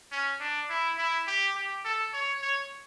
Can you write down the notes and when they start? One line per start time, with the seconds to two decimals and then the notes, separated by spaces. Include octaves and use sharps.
0.11 C#4
0.40 D4
0.69 E4
0.98 E4
1.27 G4
1.55 G4
1.84 A4
2.13 C#5
2.42 C#5